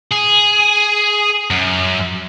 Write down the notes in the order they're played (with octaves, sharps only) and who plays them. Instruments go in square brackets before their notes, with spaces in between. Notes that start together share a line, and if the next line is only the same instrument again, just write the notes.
[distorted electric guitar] G#4
F#2